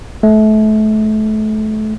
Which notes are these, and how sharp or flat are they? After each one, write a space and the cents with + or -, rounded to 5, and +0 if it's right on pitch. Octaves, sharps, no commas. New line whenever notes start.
A3 -30